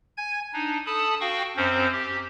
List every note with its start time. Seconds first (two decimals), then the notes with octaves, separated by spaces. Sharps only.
0.17 G#5 G#6
0.53 D4 D#4
0.86 A4 A5 B5 D#6
1.21 F#4 F5 G5 C#6
1.57 F#2 C4 C#4 C5
1.92 G4